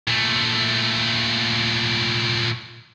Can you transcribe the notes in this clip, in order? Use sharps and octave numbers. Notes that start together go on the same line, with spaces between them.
A#2 A3